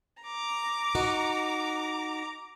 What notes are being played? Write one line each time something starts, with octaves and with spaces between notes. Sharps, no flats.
A#5 D6
D#4 F#4